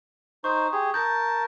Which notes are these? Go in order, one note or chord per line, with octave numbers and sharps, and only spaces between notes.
D#4 C5 C#6
G4 G#4
A#4 A5 G6